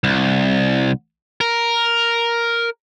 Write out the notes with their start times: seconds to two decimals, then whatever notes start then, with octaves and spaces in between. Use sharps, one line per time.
0.04 C2
1.41 A#4